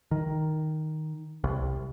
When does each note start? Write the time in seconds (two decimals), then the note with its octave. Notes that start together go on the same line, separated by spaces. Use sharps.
0.11 D#3
1.44 C2